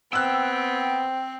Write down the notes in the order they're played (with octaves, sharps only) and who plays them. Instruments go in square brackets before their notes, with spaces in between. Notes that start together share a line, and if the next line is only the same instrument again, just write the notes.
[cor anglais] B3 [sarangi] C4 [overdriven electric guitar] G5 [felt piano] E6 F#6